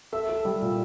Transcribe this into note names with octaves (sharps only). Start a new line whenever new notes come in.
A4 E5
A4
G3
A#2